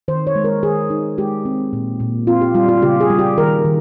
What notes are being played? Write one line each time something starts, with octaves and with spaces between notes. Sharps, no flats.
D#3 C5
C#5
G#3
A#4
D#3 G#4
D#4
G#3 G4
C4
A#2
A#2
C4 F4
G4
G3 F4
F4
C#3 G4
G#4
G3
G4
D#3 A#4
D#3